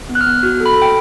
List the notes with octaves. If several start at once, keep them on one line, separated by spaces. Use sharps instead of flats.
B3
F#6
F6
B3
F#4 F6
A4
B5
A4
G5